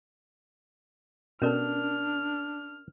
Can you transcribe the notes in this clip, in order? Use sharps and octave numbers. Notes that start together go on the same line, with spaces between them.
B2 C#4 D4 A4 A#4 D5 F6